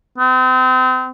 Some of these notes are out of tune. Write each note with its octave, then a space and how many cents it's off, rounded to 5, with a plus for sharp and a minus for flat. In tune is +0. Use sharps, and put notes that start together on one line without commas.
C4 -35